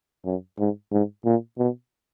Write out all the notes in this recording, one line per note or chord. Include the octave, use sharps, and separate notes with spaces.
F#2
G#2
G#2
A#2
B2